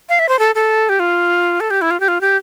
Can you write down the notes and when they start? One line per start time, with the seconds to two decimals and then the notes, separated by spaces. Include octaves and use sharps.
0.09 F5
0.19 E5
0.29 C5
0.39 A4
0.55 A4
0.89 G4
1.00 F4
1.60 A4
1.70 G4
1.81 E4
1.91 F4
2.00 G4
2.08 F4
2.21 G4